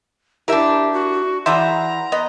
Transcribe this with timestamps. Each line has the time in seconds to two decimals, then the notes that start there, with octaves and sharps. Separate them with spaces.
0.48 D4 E4 G4 A#4 E5
0.93 F#4
1.46 E3 G#4 D5 E5 F#5 A#5 C6 G6
2.12 B3 D#5